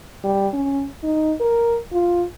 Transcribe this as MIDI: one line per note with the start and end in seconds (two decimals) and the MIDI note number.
0.24 0.48 55
0.53 0.86 61
1.03 1.33 63
1.40 1.78 70
1.92 2.24 65